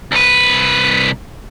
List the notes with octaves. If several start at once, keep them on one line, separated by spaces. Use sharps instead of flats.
C2 B4